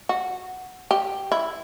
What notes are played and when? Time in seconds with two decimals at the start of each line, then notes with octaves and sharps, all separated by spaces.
0.09 F#4
0.91 G4
1.32 E4